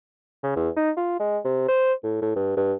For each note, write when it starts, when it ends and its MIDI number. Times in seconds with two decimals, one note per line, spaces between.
0.44 0.54 49
0.56 0.69 40
0.77 0.91 63
0.97 1.19 65
1.20 1.38 56
1.45 1.68 48
1.68 1.93 72
2.03 2.18 45
2.22 2.32 45
2.36 2.55 43
2.57 2.74 43